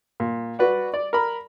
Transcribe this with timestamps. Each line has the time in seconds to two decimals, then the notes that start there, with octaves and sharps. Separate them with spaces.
0.20 A#2
0.59 F#4 B4 D5 F#5
0.94 D5
1.13 A#4 B5